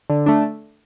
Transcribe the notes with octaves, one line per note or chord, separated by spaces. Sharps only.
D3
A3 D4